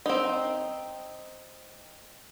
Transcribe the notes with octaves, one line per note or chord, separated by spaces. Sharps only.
C4 D#4